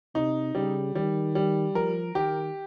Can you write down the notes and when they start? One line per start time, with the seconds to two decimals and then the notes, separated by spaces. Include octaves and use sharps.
0.15 C3 D#4
0.55 C#3 G3
0.95 D#3 G3
1.35 G3
1.75 F3 A#4
2.15 D#3 G4